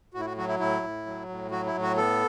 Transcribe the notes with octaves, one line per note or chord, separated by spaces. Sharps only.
A2 F#4
E4
F#4
F#3 F#4
E4
A2 E4
A2
F#3
A2
F#3 F#4
E4
A2
F#4
B3 A4